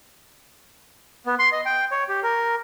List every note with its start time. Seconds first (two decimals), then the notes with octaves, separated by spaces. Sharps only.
1.26 B3
1.39 C6
1.52 D#5
1.66 G5
1.91 C#5
2.09 G4
2.23 A#4